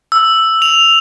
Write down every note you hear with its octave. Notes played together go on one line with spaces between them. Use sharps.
E6
F7